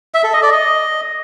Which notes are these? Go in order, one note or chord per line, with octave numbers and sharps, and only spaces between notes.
E5
A4
D#5
D5
D#5